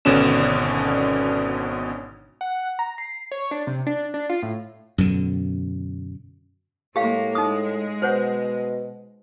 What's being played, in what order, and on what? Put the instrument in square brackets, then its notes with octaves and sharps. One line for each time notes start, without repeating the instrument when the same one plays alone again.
[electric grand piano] G#1 B2 D3 C#4 D4 E7
[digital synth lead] F#5
A#5
C7
C#5
D4
C3
D4
D4
F4
A2
[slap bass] F#2 B2 D3
[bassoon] A2 [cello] G#3 A#3 [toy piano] G4 F5
[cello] G#3 [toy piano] D#4 D#6
[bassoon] B2 [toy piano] C5 C#5 F#5